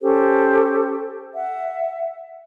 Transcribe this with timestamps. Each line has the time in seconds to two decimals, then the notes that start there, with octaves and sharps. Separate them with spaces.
0.01 C#4 G4 A4 C5
1.34 E5 F#5